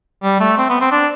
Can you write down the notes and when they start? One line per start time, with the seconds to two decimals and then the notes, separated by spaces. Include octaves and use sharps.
0.23 G3
0.40 A3
0.58 C4
0.70 B3
0.81 C4
0.92 D4